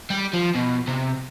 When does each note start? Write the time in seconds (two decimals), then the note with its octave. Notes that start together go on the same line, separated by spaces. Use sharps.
0.10 G3
0.33 F3
0.55 B2
0.88 C3